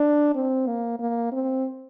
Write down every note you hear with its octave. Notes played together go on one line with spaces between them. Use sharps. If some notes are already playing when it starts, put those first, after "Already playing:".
Already playing: D4
C4
A#3
A#3
C4